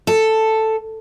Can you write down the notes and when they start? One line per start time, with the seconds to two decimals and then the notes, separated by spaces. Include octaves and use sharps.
0.07 A4